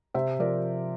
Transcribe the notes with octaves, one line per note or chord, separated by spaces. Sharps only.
C3 C5 E5
F3 A#4 D5